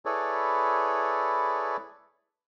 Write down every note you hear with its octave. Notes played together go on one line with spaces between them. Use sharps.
E4 G#4 A4 B4 C#5 D5